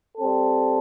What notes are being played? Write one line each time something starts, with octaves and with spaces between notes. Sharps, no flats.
G3 C4 A4